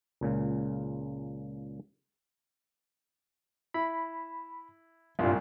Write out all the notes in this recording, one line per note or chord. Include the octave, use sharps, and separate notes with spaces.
C#2 A#2 C#3
E4 B5
C2 G2 A#2 F4